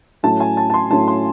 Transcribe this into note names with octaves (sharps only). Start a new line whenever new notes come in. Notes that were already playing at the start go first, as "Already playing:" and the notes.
A2 F#3 A3 C#4 A5
G#5
A5
A5
C6
A2 F#3 A3 C#4 A5
C6